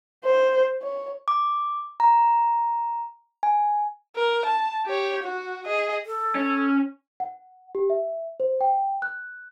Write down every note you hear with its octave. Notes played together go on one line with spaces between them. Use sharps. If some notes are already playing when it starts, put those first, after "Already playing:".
C5
C#5
D6
A#5
G#5
A#4
A5
G4 C#5
F#4
G#4 D#5
A4
C#4
F#5
G4
E5
C5
G5
F#6